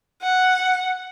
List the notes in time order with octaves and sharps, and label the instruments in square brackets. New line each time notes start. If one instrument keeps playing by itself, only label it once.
[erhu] F#5